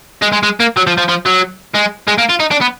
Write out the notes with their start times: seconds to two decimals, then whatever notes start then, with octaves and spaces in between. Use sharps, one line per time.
0.22 G#3
0.33 G#3
0.43 G#3
0.60 A#3
0.77 F#3
0.87 F3
0.98 F3
1.09 F3
1.26 F#3
1.74 G#3
2.08 G#3
2.18 A#3
2.29 F4
2.40 D#4
2.51 D4
2.61 B3